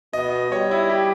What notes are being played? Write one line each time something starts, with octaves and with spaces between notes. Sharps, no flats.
B2 D#5
G3 C#5
E4
G4